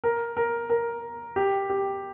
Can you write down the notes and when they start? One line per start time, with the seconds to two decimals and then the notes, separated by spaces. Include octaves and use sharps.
0.04 A#4
0.37 A#4
0.70 A#4
1.36 G4
1.70 G4